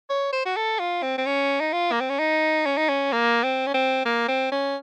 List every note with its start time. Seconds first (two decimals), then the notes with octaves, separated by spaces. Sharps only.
0.10 C#5
0.33 C5
0.46 F#4
0.57 A4
0.79 F4
1.03 C4
1.18 C4
1.26 C#4
1.60 D#4
1.73 F4
1.92 A#3
2.01 C4
2.10 C#4
2.19 D#4
2.66 C#4
2.77 D#4
2.89 C#4
3.12 A#3
3.43 C4
3.67 C#4
3.74 C4
4.05 A#3
4.28 C4
4.52 C#4